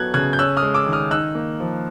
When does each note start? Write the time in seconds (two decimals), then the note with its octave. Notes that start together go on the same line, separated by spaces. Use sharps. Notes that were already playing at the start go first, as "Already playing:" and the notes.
Already playing: F#3 B3 F#6 G#6
0.14 C#3 F#6 G#6
0.33 G6
0.39 C#4 E6 F#6
0.57 D#6 F6
0.62 G#3
0.74 D6 E6
0.86 D#3
0.93 D#6 F6
1.11 D#4 E6 F#6
1.35 A#3
1.60 F3